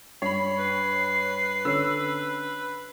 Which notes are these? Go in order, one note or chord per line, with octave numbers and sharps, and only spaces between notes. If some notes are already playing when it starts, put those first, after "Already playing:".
G2 C#5 B5 C7
B4
D3 C#4 E6